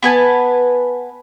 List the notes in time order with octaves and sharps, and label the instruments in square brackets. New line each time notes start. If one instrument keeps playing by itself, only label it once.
[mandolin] B3 B4 G#5 A5